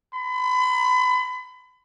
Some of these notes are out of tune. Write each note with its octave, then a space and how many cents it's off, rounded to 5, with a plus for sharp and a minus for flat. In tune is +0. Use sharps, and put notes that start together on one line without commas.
B5 +35